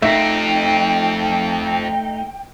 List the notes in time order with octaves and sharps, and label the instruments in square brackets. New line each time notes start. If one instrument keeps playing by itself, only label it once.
[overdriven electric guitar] F2 C4 [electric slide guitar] A3 D#4 [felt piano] E5 [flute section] G5